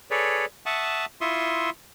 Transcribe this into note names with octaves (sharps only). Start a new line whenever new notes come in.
G#4 A4 B4 C#5 D5
E5 F#5 A5 C#6 D#6
E4 F4 E5 C6 C#6 D#6